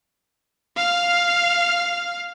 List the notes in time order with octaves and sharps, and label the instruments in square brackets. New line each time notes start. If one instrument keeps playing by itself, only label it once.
[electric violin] F5 F6